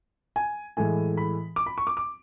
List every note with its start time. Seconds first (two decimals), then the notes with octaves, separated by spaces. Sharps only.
0.36 G#5
0.77 A2 E3 G#3 G#5
1.17 B5
1.56 D6
1.66 B5
1.78 C#6
1.87 D6
1.97 D6